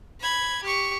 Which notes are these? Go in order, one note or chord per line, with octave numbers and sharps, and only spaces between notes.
B5 G#6
G4 C#6